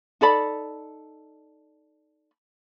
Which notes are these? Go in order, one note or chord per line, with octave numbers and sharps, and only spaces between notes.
D#4 A4 D5 B5